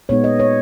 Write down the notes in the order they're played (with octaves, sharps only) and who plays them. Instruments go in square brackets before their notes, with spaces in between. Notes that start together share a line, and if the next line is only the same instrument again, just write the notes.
[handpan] A#2 G#3 B3 D#4 C#5
D#5
C#5